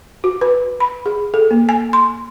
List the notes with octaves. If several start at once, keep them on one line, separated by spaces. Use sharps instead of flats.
F#4
B4
B5
G#4
A4
A#3
G#5
C6